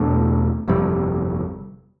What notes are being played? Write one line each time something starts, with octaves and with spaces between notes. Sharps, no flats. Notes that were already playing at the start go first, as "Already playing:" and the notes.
Already playing: E2 B2 A3 D4
G1 F2 C3 G3